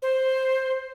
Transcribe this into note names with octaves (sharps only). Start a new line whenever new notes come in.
C5